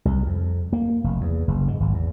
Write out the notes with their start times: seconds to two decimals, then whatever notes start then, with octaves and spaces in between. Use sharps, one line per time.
0.05 C2
0.26 F2
0.73 A#3
1.04 F1
1.21 E2
1.48 F#1
1.68 G#2
1.80 G#1
1.93 E2